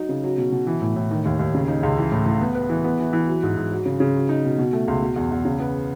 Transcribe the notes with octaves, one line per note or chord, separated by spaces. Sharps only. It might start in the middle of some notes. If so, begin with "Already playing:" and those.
Already playing: F#3 D#4
C#3
F#3
B2
B2
E3
A2
A2
D#3
D#2
D#2
C#3
D#4
C#2
E3
A2
A2
B3
B4
E3
B3
E3
E3
F#3
G#2
G#2
F#3
C#3
C#3
F#3
D#4
B2
B2
A3
C#2
B2
E2
E2
C#3
B3